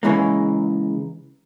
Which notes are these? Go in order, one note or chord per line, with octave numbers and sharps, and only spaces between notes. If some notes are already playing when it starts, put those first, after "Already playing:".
C#3 E3 G#3 A#3